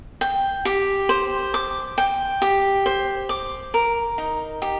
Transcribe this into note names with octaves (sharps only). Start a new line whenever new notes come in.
G5
G4
C5
D6
G5
G4
C5
D6
A#4
D#4
G4